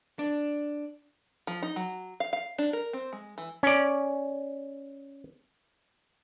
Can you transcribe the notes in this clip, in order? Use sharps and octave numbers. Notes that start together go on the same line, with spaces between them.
D4
F3
D#4
F#3
F5
F5
D4
A#4
C4
G#3
E3
C#4 D5